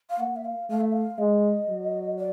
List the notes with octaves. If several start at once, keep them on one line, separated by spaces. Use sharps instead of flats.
F5
A#3 F#5
E5
F5
A3 F5
E5
F5
G#3 D#5
F#3
D5